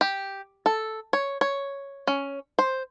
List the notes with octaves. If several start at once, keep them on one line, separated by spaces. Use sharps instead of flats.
G4
A4
C#5
C#5
C#4
C5